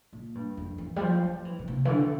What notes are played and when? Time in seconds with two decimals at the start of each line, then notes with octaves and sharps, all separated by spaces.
0.13 A#2
0.35 G2
0.57 F2
0.78 E3
0.96 G3
1.01 F3
1.24 F3
1.45 E3
1.59 A#2
1.68 C3
1.85 E3
1.89 D3